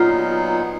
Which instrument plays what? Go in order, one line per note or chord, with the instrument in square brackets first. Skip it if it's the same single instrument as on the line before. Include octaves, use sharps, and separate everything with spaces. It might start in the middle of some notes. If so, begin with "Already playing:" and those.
Already playing: [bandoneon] A#2 F#3 B3 D#4 [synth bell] F4